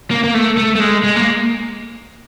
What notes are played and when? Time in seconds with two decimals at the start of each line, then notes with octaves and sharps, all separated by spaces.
0.11 A#3
0.23 A#3
0.34 A3
0.57 A3
0.76 A3
0.80 G#3
1.04 G#3
1.16 A#3